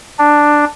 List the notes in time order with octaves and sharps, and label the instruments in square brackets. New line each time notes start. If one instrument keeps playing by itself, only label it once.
[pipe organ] D4